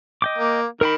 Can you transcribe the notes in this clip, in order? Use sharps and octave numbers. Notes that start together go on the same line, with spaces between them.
D#5 G5 D6
A#3
D#3 A#4 G5 B5